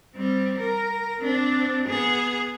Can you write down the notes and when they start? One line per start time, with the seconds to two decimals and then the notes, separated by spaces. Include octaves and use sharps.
0.15 G3 C4
0.59 A#4
1.20 C4 D4
1.88 B3 G#4